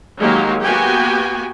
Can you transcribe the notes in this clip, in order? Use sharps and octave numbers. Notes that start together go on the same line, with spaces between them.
D#3 F#3 G#3 A#3 G4
A#3 B3 F#4 G4 G5 G#5